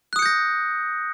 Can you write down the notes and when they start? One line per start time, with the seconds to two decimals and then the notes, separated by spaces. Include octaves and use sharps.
0.13 F#6
0.16 D#6
0.19 C#7
0.22 G6
0.26 A#6